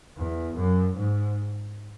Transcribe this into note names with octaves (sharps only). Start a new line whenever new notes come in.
E2
F#2
G#2